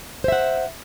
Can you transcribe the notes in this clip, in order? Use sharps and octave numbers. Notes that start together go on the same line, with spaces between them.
C5 E5 F#5